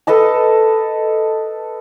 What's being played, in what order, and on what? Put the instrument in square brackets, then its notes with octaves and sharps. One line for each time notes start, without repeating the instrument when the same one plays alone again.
[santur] A4 B4 D#5 A5